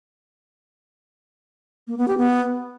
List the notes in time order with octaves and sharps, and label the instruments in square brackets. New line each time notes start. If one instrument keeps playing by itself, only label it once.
[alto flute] A#3
B3
G4
B3